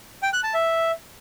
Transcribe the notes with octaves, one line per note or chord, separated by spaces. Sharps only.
G5
F#6
A5
E5